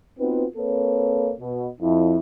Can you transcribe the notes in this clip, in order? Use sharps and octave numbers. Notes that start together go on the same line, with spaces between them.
B3 C4 D#4 F4 F#4 B4
A#3 C4 A4 B4 C#5
B2
F2 E4